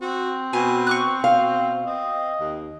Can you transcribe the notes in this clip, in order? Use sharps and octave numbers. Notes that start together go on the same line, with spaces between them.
C4 F#4
B2 G#5
C#6 D6 F#6
B2 F5
C4 D#5
D#2